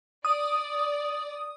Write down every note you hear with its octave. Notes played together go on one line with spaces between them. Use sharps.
D5 D#6